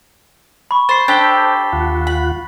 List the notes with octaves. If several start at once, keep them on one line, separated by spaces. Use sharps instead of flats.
B5 C#6
C5 A6 C7
D4 G4 A4 C5 G5 A6 B6 G7
D#2 F4 F#5
B5